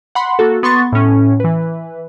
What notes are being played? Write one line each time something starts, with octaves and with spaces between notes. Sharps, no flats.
F#5 B5 C6
A#3 F#4 A4
B3 C6 C#6 A6
A2 C#4
E3 B4